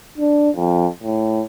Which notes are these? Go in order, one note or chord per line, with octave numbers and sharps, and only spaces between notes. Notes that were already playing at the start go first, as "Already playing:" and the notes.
D4
F2
A2